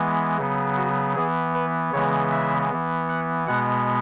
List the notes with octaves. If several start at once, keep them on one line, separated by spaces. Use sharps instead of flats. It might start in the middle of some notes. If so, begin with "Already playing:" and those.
Already playing: E3 G#3 B3
C#3 F#3 B3
F#4
E3 B3 G#4
B4
C#3 E3 G#3 B3 C#5
E5
E3 B3
F#5
B2 G#3 B3 F#5